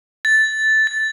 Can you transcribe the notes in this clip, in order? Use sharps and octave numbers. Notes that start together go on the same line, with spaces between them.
A6
A6